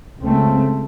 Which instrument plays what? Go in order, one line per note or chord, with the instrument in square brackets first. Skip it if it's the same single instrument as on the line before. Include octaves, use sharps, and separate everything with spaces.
[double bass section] C#2 C#3 A3 C4